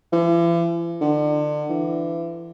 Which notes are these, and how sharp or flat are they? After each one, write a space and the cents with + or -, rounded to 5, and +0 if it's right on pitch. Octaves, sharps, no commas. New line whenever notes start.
E3 +45
D3 +35
E3 +30